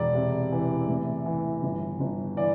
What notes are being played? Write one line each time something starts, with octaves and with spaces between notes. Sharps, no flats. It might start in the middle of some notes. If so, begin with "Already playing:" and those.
Already playing: E1 D5
C3
E3
A2
E3
G1
G1
E3 D5